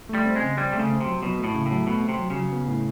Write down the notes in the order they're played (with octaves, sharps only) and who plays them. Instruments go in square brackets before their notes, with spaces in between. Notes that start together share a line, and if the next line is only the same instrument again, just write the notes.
[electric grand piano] A3
[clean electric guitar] G3
[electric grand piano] C4
[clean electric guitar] G#3
[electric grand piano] C#3
[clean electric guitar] G3 [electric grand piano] C4
[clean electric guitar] C3 [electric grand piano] A3
[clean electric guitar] C#3
[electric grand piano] C4
[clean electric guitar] C3
[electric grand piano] F#3
[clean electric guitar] B2 [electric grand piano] F#3
[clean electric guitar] A2 [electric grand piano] A3
[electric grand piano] C#3
[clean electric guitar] A2
[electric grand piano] F#3
[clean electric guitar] B2 [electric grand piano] A3
[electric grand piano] C4
[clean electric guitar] C3
[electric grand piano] F#3
[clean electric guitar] C#3
[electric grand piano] F#3
B3
A2